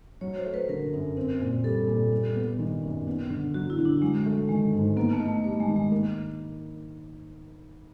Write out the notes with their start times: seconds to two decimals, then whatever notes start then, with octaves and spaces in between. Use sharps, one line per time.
0.21 F#3 C#5
0.37 C5
0.46 A3
0.54 B4
0.69 D3 A#4
0.93 F#2
1.17 C4
1.41 A#2
1.64 G3 A4
1.87 A#2
2.12 G3
2.36 B3
2.59 D#3
2.83 F#2
3.07 B3
3.30 D3
3.54 F#3 F#4
3.70 E4
3.79 D3
3.85 D4
4.02 F#3 G#3
4.26 A3
4.49 D#3 G#3
4.73 G#2
4.96 A#3 B3
5.13 A3
5.20 D#4
5.29 A3
5.44 G3 A3
5.60 G#3
5.69 D#3
5.76 G#3
5.92 A#3